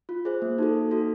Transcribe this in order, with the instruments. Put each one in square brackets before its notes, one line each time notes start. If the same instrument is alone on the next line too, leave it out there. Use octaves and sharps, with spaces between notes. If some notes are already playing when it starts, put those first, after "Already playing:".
[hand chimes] F4
G#4 C5
A#3
D#4 F#4 A4
A#3
D#4 F#4 A4